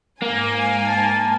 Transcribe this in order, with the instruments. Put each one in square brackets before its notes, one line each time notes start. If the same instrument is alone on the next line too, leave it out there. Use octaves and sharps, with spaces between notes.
[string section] G#2 G#5 [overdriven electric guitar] A#3
[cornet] A5